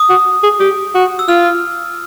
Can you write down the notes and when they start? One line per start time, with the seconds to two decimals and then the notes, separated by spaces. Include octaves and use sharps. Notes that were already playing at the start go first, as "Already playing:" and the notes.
Already playing: D#6
0.10 F#4
0.43 G#4
0.60 G4
0.95 F#4
1.19 E6
1.28 F4 F6